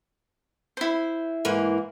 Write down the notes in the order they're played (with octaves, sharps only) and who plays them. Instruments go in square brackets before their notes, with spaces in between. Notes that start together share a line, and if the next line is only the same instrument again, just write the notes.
[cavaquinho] E4 C5
[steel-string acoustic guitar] G#2 E3 A#3